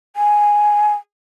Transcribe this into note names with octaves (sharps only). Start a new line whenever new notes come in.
G#5